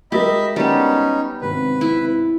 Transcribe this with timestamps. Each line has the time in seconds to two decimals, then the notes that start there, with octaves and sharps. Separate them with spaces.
0.12 G#3 F#4 G4 A#4 D#5 E5 B5
0.56 G3 B3 C#4 D#4
1.41 G#1 C3 B4
1.81 E4